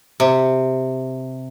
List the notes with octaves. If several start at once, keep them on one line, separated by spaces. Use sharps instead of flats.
C3